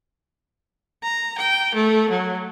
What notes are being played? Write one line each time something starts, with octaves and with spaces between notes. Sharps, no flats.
A#5
G5
A3
F#3